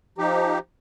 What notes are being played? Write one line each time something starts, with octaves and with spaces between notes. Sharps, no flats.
F3 D#4 G4